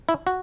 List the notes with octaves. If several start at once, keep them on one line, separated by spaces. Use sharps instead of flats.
E4
F#4